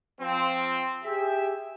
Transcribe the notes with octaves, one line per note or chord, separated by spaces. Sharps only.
F3 C4
G4 G#4 E5